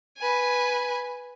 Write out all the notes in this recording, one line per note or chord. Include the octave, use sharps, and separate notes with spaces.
B4 G#5